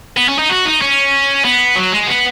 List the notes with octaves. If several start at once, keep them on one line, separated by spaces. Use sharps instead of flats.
B3
C#4
D#4
F#4
D#4
C#4
B3
F#3
G#3
B3